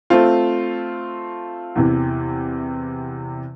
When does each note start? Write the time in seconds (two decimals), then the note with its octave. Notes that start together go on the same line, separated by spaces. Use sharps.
0.10 A3 C4 F4
1.76 E2 C3 E3